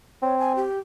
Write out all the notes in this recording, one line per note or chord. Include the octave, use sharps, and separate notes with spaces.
C4 C#5
G#5
G4